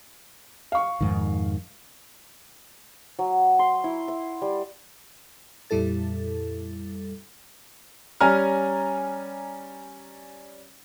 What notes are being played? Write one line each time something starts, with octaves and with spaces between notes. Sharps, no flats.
F5 C#6
F2 G#2 D#3
F#3
C6
E4
E5
G3
F2 A#2 G3 E4 A4 A6
G3 C#4 G#5 A#5 F6